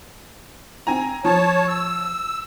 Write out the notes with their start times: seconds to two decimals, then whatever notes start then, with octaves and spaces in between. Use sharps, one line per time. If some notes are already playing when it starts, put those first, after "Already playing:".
0.87 C4 G#5 A#5
1.25 F3 C#5 A5
1.68 E6